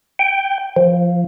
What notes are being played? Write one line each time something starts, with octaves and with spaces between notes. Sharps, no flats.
G5
F3